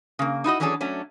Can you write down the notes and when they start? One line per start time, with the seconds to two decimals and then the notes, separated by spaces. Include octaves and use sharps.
0.19 C#3 A#3
0.44 D#4 E4 F#4 D#5
0.60 E3 F#3 C#4 D4 G#4 A4
0.81 F#3 A3 C#4 D4